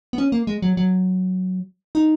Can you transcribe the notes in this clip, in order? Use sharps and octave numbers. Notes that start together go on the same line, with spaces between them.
B3
C#4
A#3
G#3
F#3
F#3
D#4